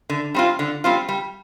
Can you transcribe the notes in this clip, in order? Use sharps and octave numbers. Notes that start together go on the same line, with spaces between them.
D3
G3 C4 F4
D3
G3 C4 F4
G3